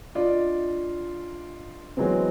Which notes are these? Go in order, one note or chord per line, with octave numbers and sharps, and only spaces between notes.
D4 F4 D5 D#5
E3 F#3 G#3 B3 C4